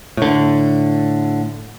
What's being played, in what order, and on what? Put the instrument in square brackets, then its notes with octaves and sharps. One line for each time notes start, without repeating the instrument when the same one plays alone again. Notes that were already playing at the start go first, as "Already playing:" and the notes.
[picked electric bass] A2 D3